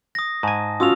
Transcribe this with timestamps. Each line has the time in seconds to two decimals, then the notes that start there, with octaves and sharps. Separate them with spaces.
0.15 D#6 A#6
0.43 G#2 G#5 A5
0.80 C#4 F4 F#4 D#6 E6 F7